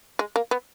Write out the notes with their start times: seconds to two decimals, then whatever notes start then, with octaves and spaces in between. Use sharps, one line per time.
0.19 G#3
0.36 A#3
0.51 B3